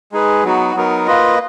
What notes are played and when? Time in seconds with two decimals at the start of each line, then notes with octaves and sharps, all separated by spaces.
0.12 G#3 D#4 G#4 B4
0.43 F#3 B3 D#4 F#4
0.75 F#3 B3 D#4 A#4
1.07 A#3 F4 B4 D#5